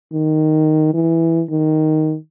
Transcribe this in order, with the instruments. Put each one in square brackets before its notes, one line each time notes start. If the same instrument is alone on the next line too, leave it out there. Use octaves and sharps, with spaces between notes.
[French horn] D#3
E3
D#3